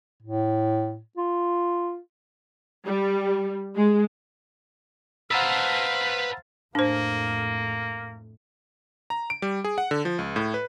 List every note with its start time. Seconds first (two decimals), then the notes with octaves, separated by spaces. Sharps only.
0.23 A2
1.17 F4
2.86 G3
3.76 G#3
5.31 B4 C5 F5 F#5 A5 A#5 E6
6.75 F2 A2 A#3 D4 C5
9.10 A#5
9.30 D7
9.42 G3
9.64 G#4
9.78 F#5
9.91 D3
10.05 F3
10.19 C#2
10.36 A2
10.54 B4